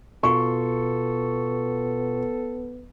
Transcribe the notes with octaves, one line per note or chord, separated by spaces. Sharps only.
B2 B3 F4 A4 C6 C#6